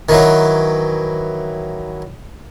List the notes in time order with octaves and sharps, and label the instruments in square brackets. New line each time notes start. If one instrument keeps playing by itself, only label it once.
[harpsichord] D#3 E3 F#3